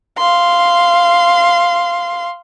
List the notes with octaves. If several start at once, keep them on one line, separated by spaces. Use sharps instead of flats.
F5 C6